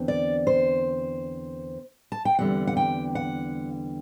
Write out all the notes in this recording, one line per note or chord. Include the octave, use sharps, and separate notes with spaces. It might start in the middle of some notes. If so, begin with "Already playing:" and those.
Already playing: E2 D3 C4
D5
C5
A5
G5
E2 D3 G3 C4 F#5
F#5
G5
F#5